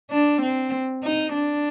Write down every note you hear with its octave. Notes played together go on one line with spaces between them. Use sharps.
D4
C4
D#4
D4